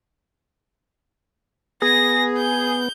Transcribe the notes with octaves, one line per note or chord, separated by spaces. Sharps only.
B3 G#4 A#6
G6